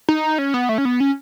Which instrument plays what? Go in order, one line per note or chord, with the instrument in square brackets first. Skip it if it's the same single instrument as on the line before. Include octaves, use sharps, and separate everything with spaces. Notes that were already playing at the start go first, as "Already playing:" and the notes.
[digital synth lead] D#4
C#4
B3
A3
C#4
B3
C#4